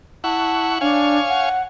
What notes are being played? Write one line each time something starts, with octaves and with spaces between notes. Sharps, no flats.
E4 F#5 A5 C#6
D4 C#5 F5 G#5
F#5